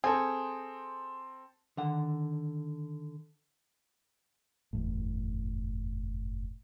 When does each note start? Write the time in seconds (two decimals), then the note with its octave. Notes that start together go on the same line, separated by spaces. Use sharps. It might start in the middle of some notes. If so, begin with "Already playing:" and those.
0.04 C4 G#4 A4
1.77 D3 D#3 F#5
4.73 F#1 E2 A2